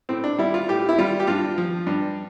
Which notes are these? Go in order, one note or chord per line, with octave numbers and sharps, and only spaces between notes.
A2 C4
D4
G3 E4
F4
A2 G4
E4
G3 F4
G4
G2 F4
F3
G2